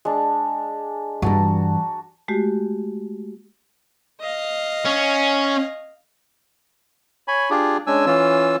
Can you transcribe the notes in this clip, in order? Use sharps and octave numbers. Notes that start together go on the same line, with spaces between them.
G#3 D4
G2 E3 F#4 A5 A#5
G#3 A3 F#4 G4
D#5 F5
C#4
C#5 G#5 B5
D4 F4 G4 G#4
G#3 C#4 D4 G#5 E6
E3 C#4 F4 E6